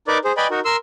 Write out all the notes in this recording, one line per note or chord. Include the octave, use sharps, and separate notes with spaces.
D#4 A#4 B4 D5 D6
G#4 C5
B4 D5 D#5 G5 G#5 B5
D#4 F#4 A#4
A#4 C6 E6